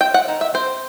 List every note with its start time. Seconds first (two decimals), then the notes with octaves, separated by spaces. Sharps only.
0.01 C4 G5
0.14 F#5
0.28 D#3
0.41 E5
0.54 C4 C5